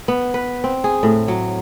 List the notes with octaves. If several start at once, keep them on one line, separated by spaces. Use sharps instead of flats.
B3
B4
C4
G#4
A2
F#3